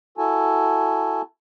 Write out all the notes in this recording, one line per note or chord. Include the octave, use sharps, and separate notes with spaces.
E4 F#4 A4 G#5 A5